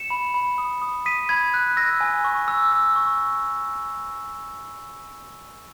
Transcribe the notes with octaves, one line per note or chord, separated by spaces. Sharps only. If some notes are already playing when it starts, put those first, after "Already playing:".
Already playing: C#7 E7
B5
B5
D#6
D#6
D#6 B6 D#7
B5 G#6
F#6
E6 A#6
G#5
C#6
E6
E6
C#6